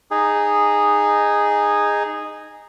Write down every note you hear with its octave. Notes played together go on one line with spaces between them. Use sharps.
D#4 G#4